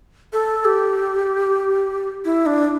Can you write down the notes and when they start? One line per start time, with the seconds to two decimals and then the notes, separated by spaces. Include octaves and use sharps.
0.33 A4
0.65 G4
2.25 E4
2.46 D4